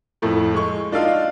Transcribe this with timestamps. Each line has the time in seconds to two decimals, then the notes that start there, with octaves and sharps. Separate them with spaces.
0.22 F2 A2 A3
0.54 G#3 C#6
0.92 D4 D#4 F4 F5